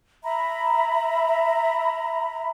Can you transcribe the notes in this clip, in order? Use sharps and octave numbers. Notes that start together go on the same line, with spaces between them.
E5 A#5 B5